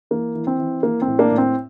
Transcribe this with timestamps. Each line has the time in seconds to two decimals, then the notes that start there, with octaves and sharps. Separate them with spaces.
0.11 E3 A#3
0.35 E3
0.47 C4
0.59 E3
0.83 E3 A#3
1.02 C4
1.07 A2
1.19 A#3 D4
1.31 A2
1.38 C4